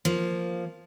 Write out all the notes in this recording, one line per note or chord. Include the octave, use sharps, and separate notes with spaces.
F3 A#3